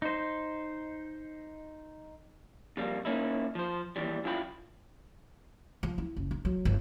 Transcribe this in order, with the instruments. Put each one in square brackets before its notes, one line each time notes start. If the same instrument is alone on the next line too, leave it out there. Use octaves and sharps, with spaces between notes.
[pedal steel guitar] D#4 C5
[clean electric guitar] F2 G3 A#3
A#3 C#4 D#4 E4
F3 C5
D#2 E3 G3
F#2 E4 F4 G5 B5
[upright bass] F3
E4
F#1
D#4
F#3
G1